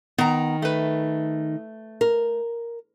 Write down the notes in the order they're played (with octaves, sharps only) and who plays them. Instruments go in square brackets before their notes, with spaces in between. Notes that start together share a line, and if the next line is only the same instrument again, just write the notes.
[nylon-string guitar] D#3 [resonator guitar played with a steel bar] B3 A#5
[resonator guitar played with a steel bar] A3 B4
[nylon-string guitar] A#4